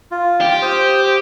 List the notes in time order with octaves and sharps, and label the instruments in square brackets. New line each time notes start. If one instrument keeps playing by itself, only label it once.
[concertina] F4
[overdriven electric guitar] G4
[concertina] C5 D#6